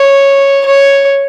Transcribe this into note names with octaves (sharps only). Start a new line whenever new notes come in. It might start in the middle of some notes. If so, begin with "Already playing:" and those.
Already playing: C#5
C#5